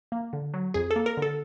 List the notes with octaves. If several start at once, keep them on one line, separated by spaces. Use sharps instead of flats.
A#3
D3
F#3
F2 G#4
A4
A#3
A#4
D3
A4